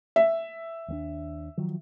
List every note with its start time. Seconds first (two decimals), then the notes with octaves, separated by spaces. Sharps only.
0.16 E5
0.88 D#2 A3 D4
1.58 D#3 F3 F#3